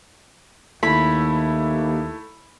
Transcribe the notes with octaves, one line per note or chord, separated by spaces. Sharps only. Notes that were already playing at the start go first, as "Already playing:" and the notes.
D#2 A3 E4 B5